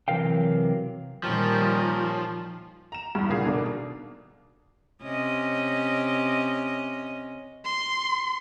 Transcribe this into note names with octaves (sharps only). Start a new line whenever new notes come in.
C3 E3 F#3 A#4 F5 G5
A#2 D#3 F3 G3 C#4 G4 A#4
A#5 E7
E2 G2
F#1 D2 A#2 D4 G#4 F5
B2 D#3 A#3 D4
C3 C#4 D#5
C6